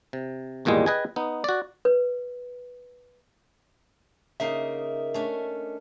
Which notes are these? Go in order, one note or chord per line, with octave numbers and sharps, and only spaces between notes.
C3
G#1 E2 A#2 G3 G#3
G#4 B4 D#5 G5 G#5
B3 D#4
F#4 D5
B4
C#3 A#3 D#4 A#4 D#5 E5
A3 C#4 D4